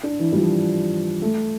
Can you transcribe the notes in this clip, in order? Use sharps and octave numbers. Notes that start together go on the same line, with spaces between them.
D4
E3
G3
F3
A3